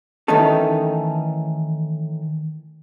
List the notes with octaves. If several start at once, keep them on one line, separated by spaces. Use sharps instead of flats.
D#3 E3 A3 C#4 D#4 A4